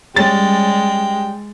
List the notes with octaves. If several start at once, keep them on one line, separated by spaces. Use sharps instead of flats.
G3 G#3 C#4 G5 A6